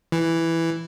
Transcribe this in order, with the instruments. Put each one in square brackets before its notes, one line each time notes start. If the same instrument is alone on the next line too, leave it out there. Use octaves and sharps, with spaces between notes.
[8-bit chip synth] E3